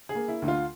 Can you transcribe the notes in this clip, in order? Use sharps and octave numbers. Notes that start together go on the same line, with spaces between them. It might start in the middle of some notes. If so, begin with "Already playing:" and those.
G#4
A#3
E4
D2
F4